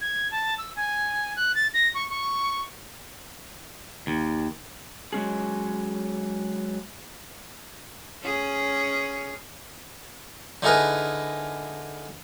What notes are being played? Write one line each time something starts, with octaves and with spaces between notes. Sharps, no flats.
G#6
A5
E6
G#5
F#6
A6
A#6
C#6
C#6
D#2
F#3 G#3 C#4 G#4
C#4 G#4
D3 D#4 E4 G#4 A#4 B4